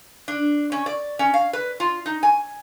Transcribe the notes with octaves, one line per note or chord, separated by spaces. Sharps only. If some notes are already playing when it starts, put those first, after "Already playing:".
D4
C#4
D5
C#4
F5
B4
F4
D#4
G#5